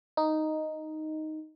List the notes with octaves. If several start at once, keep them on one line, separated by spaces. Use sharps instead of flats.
D#4